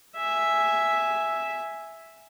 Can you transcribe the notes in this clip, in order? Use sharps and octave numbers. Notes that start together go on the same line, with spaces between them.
E5 G#5